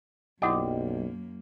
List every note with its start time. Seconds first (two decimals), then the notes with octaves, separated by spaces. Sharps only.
0.42 B1 F#2 A#3 E4 G4 D5 D#5 F#5